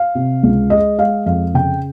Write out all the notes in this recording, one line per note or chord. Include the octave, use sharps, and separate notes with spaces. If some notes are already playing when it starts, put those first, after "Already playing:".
Already playing: F5
C3
C#2
G#3 D#5
G#3 F5
F2 F5
C#3 G5